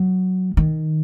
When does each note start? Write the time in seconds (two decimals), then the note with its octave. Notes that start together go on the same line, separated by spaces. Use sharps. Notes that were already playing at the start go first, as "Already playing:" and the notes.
Already playing: F#3
0.57 D#3